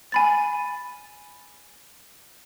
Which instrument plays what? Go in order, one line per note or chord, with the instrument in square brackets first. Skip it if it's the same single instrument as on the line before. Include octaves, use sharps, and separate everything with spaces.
[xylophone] G#5 B5 A6